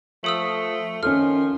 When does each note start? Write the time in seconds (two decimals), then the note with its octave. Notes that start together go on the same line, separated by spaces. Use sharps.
0.24 F3 A3 A4 D#6 E6
1.03 D#3 F3 C#4 A4 F6